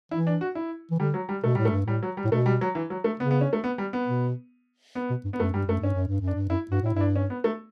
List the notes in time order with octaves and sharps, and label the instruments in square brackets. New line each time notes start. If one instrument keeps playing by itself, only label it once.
[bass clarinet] E3 [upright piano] E4
[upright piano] D4
F#4
E4
[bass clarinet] E3
[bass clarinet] D3 [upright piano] G3
[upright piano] F#3
G3
[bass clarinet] B2 [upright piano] A3
[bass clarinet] A2 [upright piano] G3
[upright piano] A3
[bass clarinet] G2
[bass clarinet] A2 [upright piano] G3
[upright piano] F#3
G3
[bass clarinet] A2
[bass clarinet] B2 [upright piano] A3
[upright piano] G3
F#3
E3
F#3
A3
[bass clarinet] C#3 [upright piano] B3
[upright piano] B3
C#4
A3
B3
G3
B3
[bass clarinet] B2
[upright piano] B3
[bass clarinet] B2
G2
[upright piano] B3
[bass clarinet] F#2 [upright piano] A3
[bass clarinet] G2 [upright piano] G3
[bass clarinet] F#2 [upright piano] A3
[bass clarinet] G2 [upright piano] C#4
[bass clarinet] F#2
G2
F#2
[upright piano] D4
[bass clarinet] G2
[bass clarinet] F#2 [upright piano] E4
[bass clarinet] G2 [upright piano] F#4
[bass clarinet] A2 [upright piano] E4
[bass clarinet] G2 [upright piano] E4
[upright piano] D4
C#4
B3
A3